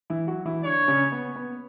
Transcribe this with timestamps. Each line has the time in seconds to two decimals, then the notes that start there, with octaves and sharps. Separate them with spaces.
0.10 E3 E4
0.27 F#3 F#4
0.45 E3 E4
0.64 D3 D4 C#5
0.88 C#3 C#4
1.12 B3
1.36 B3